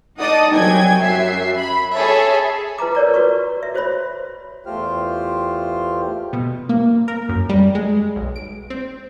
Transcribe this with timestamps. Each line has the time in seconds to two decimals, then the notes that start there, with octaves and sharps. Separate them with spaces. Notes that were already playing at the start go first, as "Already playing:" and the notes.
0.19 D#4 D5 D#5 F#5 A5 D#6
0.54 C2 F#3 G5 G#5 G#6
1.02 F#2 E5 C7
1.58 B5
1.93 G#4 A4 C#5 E5 A5
2.78 F4 B4 A5 A#5 D6
2.95 A#4 C#5 D5 A#5
3.14 F#4 B4 C#6
3.63 E5
3.75 F#4 C5 C#5 E5 B5
4.66 E2 A3 F4 G4 C5 F6
6.33 B2
6.69 A#3
7.08 A#4
7.29 F#2
7.49 G3
7.75 G#3
8.16 B1
8.36 D7
8.70 C4